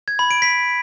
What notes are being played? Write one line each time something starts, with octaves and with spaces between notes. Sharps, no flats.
G#6
B5
D7
B6